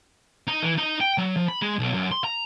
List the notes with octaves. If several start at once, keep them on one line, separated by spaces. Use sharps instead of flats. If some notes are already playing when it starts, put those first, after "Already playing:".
D#4
E3
D#4
G5
F#3
F3
B5
G#3
B1
F#2
C6
A#5